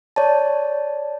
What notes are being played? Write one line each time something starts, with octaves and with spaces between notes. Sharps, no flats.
C#5 D5 A5